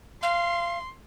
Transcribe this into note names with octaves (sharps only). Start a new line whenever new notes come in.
F5 C6